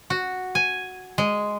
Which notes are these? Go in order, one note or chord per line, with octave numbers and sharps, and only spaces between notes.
F#4
G#5
G#3